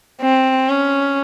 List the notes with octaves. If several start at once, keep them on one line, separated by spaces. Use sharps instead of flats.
C4
C#4